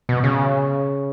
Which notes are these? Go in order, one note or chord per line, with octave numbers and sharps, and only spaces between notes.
B2
C#3